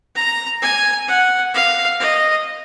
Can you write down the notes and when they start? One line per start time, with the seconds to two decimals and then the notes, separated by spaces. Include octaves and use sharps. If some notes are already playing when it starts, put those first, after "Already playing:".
0.16 A#5
0.62 G#5
1.08 F#5
1.54 F5
2.00 D#5